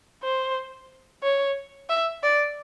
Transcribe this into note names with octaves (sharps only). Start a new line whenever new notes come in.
C5
C#5
E5
D5